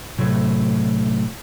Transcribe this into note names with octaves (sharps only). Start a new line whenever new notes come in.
A2 C3 F#3 A3